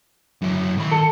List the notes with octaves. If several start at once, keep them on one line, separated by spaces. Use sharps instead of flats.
F#2 E4
D#3 B5
A4